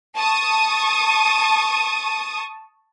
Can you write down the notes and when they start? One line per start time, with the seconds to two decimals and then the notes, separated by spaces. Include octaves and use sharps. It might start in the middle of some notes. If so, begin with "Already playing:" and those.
0.17 A5 C#6 D#6